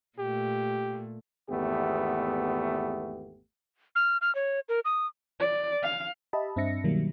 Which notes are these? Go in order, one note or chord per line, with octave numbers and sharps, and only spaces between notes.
A#2 A3 G4
G#1 E2 A3 B3 G4
F6
F6
C#5
A#4
D#6
D5
F5
G4 D#5 E5 A5 B5
G2 C4 D4 E5 A#6 C#7
B2 D#3 F#3 G3 A#3